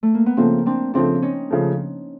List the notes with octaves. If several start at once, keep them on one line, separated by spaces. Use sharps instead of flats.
A3
A#3
B3
C#3 F3 A3 A#3 C4
C4 D4
C#3 F3 A3 C4 D4
C#4 D#4
C#3 F3 A3